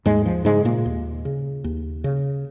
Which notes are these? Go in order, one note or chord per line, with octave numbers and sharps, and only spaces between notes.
D#2 G#2 G#3
F3
G#2 C#3 G#3
A#2 A#3
D#2
C#3
D#2
C#3